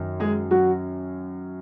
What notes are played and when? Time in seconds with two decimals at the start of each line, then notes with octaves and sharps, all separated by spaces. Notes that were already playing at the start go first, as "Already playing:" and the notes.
Already playing: F#2 D#3
0.20 G#3 G#4
0.51 F#3 F#4